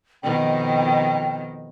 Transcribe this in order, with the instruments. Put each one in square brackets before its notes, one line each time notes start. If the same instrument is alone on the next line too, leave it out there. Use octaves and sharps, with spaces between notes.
[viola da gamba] F2 B2 D#3 [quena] G5